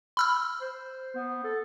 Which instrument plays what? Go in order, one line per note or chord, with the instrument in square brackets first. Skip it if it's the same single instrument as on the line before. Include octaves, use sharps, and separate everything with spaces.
[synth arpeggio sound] B5 E6 F6
[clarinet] C5
B3
A4